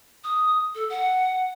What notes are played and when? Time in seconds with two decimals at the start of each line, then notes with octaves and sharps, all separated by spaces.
0.24 D#6
0.75 A4
0.90 F#5